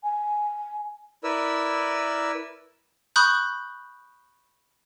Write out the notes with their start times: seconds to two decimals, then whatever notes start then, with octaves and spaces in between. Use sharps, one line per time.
0.03 G#5
1.24 E4 A#4 B4 D5 E6
3.16 B5 C#6 D#6 F#6 G6